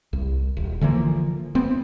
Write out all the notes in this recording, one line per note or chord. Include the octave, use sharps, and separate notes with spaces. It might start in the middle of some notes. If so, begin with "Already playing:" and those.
C2
D#1
D3 E3 F3 A#3
A3 B3 C4